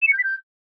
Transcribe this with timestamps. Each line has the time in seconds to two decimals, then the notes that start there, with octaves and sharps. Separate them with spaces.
0.02 E7
0.08 C#7
0.13 G6
0.18 B6
0.24 G6